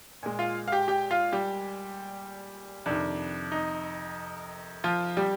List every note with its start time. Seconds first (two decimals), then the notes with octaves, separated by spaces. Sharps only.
0.23 A#2 G#3
0.39 F4 F5
0.68 F5
0.72 G4 G5
0.88 G4 G5
1.11 F4 F5
1.33 G3 G4
2.86 F2 C3 D#3 D4
3.52 D#4
4.84 F3 F4
5.17 G3 G4